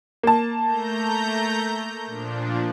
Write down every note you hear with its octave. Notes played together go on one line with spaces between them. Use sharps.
A#3 A5
A3 A#5 G6
A#2 F3 D4